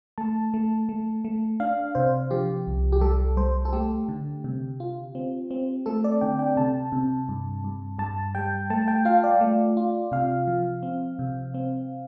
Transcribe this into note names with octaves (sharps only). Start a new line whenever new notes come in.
A3 A5
A3
A3
A3
D4 F5
C3 C5
F3 G4
C2
G4
G3 A4
G3 C5
A4
A3 G4
D3
C3
F4
C4
C4
A3 A4
D5
D3 G5
G5
C3 A5
C3
G2
G2
G2 A5
G3 G5
A3 A5
G5
F4 F5
D5
A3
F4
C3 F5
F3
C4
C3
C4